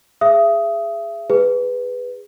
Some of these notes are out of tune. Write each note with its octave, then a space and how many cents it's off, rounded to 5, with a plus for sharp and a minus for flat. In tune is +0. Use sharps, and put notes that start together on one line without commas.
G#4 +0 E5 +35 D#6 +10
G#4 -20 B4 +0